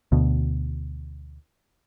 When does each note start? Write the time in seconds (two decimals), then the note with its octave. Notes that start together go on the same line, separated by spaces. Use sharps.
0.12 D2 B2